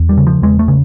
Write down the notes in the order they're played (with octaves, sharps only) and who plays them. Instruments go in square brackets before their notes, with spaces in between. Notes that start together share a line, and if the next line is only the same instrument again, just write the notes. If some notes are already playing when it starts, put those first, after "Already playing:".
Already playing: [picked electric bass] E2
G3
C#3
F3
E2 G#3
A3
C#3